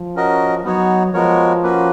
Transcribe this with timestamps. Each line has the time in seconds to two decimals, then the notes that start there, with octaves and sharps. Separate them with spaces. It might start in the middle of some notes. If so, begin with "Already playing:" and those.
Already playing: F3
0.15 C#4 F#4 A#4 D#5
0.64 F#3 B3 D#4 F#4 C#5
1.14 F3 G#3 B3 F#4 A#4 C#5
1.62 A#3 C#4 F#4 B4